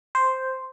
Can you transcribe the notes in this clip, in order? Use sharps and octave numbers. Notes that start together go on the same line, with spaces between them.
C5